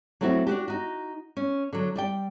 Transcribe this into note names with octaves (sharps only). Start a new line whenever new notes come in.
F#3 A3 C4 E4 F#4
D4 D#4 F#4 G4
D#4 F#4
C#4
D3 F#3
G3 D5 G5